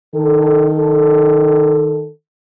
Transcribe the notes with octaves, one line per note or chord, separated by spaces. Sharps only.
D#3 A4